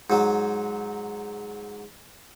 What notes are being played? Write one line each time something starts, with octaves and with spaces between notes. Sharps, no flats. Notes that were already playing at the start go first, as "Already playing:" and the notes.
G#2 F#3